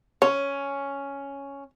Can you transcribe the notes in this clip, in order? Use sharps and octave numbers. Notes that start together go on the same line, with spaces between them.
C#4 C#5